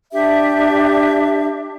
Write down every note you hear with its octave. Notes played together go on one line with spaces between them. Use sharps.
D4 G4 E5